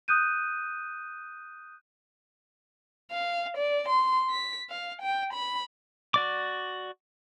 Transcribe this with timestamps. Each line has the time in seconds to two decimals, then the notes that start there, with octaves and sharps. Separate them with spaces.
0.08 D#6 F#6 G6 D#7
3.11 F5
3.57 D5
3.88 C6
4.30 B6
4.70 F5
5.02 G5
5.33 B5
6.14 F#4 D5 D6